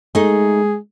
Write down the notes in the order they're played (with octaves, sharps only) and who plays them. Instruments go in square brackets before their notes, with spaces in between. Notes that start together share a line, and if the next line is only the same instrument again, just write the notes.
[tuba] G#3 [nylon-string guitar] A3 D#4 [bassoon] G#4